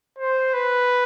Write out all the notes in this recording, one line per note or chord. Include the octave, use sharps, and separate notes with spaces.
C5
B4